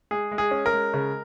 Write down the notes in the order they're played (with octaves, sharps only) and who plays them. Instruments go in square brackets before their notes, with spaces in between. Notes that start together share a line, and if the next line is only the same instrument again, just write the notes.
[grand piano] G#3 G#4
G#3
G#4
C#4
A#4
G#3
C#3